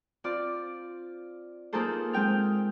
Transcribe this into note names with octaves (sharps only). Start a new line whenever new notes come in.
C4 F4 D5
A#3 D#4 F4 G#4 A4 C5
G#3 C4 G5 F6